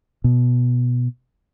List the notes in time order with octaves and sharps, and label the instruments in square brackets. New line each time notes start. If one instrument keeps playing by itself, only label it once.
[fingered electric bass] B2